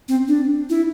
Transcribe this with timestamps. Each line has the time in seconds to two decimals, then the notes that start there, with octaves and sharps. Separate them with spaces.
0.09 C4
0.28 D4
0.70 E4